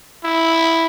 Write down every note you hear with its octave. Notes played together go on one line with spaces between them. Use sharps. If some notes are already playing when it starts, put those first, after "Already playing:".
E4